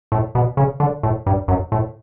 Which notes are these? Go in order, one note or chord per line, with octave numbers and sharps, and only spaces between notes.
A2
B2
C#3
D3
A2
G2
F#2
A2